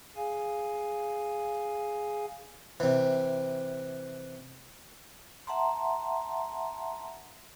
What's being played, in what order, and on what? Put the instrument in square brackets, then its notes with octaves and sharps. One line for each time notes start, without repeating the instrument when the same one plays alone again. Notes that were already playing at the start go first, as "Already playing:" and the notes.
[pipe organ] G#4 F5 G#5
[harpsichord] C3 E3
[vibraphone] E5 F#5 A5 A#5 C6